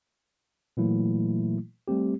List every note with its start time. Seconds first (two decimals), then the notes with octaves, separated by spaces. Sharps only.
0.77 A#2 E3 F#3 A3 A#3 E4
1.88 G3 A3 C4 G4